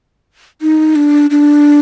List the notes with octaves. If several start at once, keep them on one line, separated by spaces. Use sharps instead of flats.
D#4
D4
D4